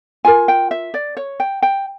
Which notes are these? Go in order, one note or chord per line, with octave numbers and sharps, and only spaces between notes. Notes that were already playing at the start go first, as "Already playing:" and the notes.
F4 A#4 G#5
G5
E5
D5
C#5
G5
G5